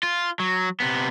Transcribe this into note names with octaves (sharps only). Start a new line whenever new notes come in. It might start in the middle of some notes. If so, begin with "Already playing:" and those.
F4
F#3
C3 B3